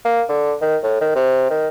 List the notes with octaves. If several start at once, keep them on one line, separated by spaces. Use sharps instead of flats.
A#3
D3
D#3
A2
D#3
C3
D#3